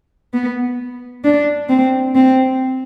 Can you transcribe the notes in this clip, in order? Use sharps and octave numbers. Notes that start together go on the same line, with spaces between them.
B3
D4
C4
C4